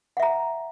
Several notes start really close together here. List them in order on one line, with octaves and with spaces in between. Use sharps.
F#5 E5 A#5